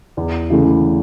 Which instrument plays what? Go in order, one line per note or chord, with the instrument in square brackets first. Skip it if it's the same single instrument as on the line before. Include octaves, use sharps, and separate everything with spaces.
[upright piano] E2
C#3 E3 A3 E4